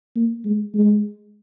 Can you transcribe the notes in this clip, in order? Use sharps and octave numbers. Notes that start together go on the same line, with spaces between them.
A#3
G#3
G#3